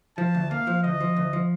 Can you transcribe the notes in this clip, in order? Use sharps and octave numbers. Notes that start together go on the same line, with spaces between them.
F3 A5
D2
A#3 F5
F3
D2 D#5
F3
D2
F3